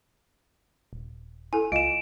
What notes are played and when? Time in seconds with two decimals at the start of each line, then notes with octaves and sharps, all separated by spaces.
0.93 D#1
1.53 E4 A4 G#5
1.72 C#2 F4 D#5 F5 D7 E7